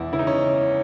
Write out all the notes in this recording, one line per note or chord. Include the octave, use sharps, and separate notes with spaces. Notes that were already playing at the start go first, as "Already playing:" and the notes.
Already playing: E1 E2 E4
C#3 E4
D#4
C#4